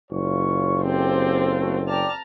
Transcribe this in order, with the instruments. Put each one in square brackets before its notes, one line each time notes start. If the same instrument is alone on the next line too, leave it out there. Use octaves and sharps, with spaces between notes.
[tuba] F#1 [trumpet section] F4 C#5 C#6
[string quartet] C4 F4 A4 [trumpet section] G4 C5
[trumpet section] A3 F#4
[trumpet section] D5 G5 D6 [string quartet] A5 A#5 F6